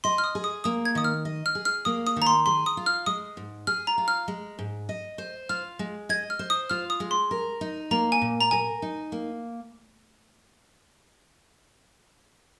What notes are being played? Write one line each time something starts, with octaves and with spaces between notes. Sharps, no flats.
D#5 C6
F6
D#6
G#4
D#6
A#3 D#6
G#6
D#3 D#6
F6
D#5
F6
G#4
F6
A#3 D#6
D#6
D#3
A#5
C6
G#4 C6
D#6
F4
F6
G#3 D#6
G#2
G#4 F6
A#5
F4
F6
G#3
G#2
D#5
C5
F4 F6
G#3
D#5 G#6
F6
C5
D#6
F4 F6
D#6
G#3
C6
A#4
D#4
A#3 A#5
G#5
A#2
A#5
A#4 G#5
D#4
A#3